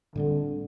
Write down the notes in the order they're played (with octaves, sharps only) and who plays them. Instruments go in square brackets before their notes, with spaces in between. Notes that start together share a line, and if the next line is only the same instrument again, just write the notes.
[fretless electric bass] A2 G3 C4 [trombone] D3